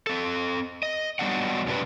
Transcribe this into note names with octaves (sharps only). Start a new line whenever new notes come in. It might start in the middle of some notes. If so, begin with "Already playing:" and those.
C4 A4
D#5
F#3 G3 B3 D4 D#5 F#5
F#2 C3 D4 F4 G4 B4